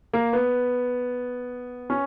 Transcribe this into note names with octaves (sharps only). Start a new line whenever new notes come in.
A#3
B3
C#4